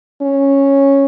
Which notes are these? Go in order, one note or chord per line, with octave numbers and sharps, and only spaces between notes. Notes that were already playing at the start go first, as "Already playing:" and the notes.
C#4